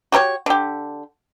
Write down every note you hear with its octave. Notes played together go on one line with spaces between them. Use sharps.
F#4 G4 A#4 C#5
D3 G4